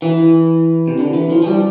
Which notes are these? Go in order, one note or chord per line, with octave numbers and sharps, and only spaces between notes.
E3
C3
D3
E3
F3
F3
G3